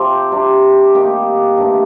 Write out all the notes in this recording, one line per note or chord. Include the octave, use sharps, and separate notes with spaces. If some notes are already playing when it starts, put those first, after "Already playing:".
Already playing: C3 F3 C4 G4
C3 G3 D4
D#3 A#3 D#4 G4
G2 D3 A3